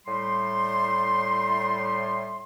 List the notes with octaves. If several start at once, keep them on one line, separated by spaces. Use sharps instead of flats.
A2 G3 C6